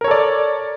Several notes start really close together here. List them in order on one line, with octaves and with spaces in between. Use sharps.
A#4 C#5 A4 D5